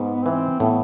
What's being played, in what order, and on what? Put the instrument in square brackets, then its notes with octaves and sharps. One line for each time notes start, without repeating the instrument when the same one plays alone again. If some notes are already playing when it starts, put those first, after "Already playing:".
Already playing: [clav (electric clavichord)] G#2 [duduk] B3
[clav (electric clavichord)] E3 [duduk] C4
[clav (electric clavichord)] A2 [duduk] B3